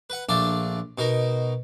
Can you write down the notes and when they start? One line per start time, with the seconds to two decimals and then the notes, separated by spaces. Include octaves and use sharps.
0.10 B4 F#5
0.29 A#1 A3 D4 F4 D5
0.98 B2 D#4 A#4